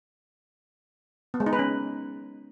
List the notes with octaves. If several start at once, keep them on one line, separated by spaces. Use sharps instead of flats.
B3
G#3
D#4
B4
C#4